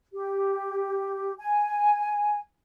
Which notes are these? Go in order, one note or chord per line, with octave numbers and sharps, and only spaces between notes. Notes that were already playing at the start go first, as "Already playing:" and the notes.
G4
G#5